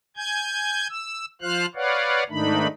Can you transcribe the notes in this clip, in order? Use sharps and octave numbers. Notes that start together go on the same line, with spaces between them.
G#5 G6 G#6
E6
F3 F4 C5 F5 F6 F#6
B4 C#5 D5 F5 F#5
G#2 D#3 A3 D4 D#4 B5